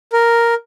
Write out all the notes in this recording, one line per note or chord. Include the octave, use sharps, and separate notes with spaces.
A#4